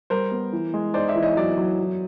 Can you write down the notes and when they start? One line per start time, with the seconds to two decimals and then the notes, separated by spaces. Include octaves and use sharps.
0.10 G3 A#4 C5
0.31 B3
0.53 E3
0.74 G#3
0.94 D#4 C5 D5
1.08 D5 E5
1.16 E3
1.22 C#5 D#5
1.37 F#3 D5 E5
1.58 F#3
1.79 F#3